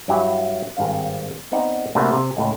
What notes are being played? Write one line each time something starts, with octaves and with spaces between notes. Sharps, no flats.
G2 F#3 E4 G4 G5
G#1 G2 C4 F5
B3 C4 D#4 D5 F#5
C3 A3 A#3 D4 F#4 B4
C3
C#2 A2